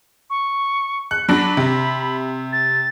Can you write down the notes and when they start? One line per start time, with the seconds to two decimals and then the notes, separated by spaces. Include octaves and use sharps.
0.30 C#6
1.11 F#6 C#7
1.29 F#3 D4 B5 A#6
1.57 C3
2.53 A6